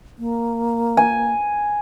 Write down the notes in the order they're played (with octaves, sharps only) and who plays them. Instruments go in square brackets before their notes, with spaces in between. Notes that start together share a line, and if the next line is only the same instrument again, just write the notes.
[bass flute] A#3
[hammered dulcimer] G#5